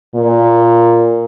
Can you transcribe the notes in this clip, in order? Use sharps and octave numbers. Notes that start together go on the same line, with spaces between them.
A#2